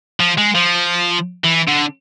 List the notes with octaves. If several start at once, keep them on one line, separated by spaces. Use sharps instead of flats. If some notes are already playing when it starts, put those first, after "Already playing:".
F3
G#3
F3
E3
D3